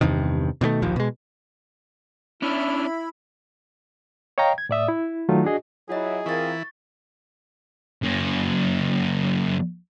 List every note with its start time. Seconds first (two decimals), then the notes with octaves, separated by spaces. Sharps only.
0.01 E2 G2 C3 D#3
0.61 B2 D#3 F3 A3
0.82 D1 A#1 D#2 F3
0.96 B2 G#3
2.42 C#4 D4 E4 B5
4.38 C#5 D#5 F5 G5 A#5
4.58 G#6
4.69 A2 D5 E5 D#6
4.88 E4
5.29 D#3 F#3 A3 D#4 F4
5.44 D4 F#4 G#4 D#5
5.89 F#3 E4 F4 G#4 D#5
6.26 E3 C4 E4 F4 A#4 C#6 A6
8.02 F#2 A#3